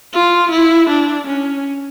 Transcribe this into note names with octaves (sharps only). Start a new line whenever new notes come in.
F4
E4
D4
C#4